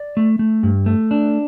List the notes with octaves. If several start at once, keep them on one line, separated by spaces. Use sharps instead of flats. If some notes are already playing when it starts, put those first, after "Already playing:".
Already playing: D5
A3
A3
G2
A3
D4